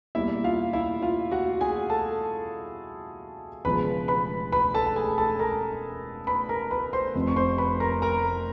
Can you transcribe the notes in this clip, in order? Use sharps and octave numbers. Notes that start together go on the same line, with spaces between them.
E2 B2 G3 A#3 E4 E5
F4 F5
E4 E5
F4 F5
F#4 F#5
G#4 G#5
A4 A5
E1 E2 C#3 F3 G#3 B4 B5
B4 B5
B4 B5
A4 A5
A5
G#4 G#5
A4 A5
A#4 A#5
B4 B5
A#4 A#5
B4 B5
C5 C6
F1 F2 C3 F3
C#6
C5 C6
B4 B5
A#4 A#5
A#4 A#5